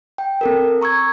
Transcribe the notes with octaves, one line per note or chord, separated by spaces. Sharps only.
G5
C4 A4 A#4
A#5 C#6 E6 G#6